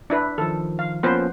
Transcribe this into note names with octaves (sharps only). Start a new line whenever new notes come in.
D4 E4 B4
D#3 F3 A4
F5
F3 A#3 B3 C#4 B4 C5